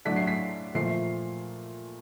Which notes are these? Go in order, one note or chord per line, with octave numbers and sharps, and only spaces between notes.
A2 F#3 A3 D4 B6
C7
B6
A#2 F3 A3 C7